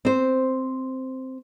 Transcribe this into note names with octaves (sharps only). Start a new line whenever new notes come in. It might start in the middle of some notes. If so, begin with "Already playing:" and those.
C4 C5